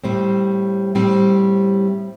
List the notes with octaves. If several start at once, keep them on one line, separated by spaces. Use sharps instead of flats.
A2 G3 C4 C5
A2 G3 C4